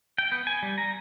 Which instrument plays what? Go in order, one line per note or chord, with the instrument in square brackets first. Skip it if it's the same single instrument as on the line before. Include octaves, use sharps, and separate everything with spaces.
[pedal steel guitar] G5
B3
G#5
G3
A#5